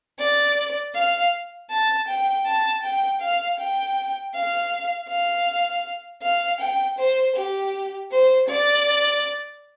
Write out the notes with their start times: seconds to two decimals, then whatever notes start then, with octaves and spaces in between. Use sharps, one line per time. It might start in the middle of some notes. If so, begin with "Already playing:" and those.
0.19 D5
0.95 F5
1.70 A5
2.08 G5
2.46 A5
2.83 G5
3.21 F5
3.59 G5
4.34 F5
5.09 F5
6.22 F5
6.60 G5
6.98 C5
7.36 G4
8.11 C5
8.49 D5